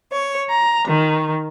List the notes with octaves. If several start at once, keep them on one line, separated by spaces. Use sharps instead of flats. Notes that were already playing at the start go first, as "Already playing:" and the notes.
C#5
A#5
D#3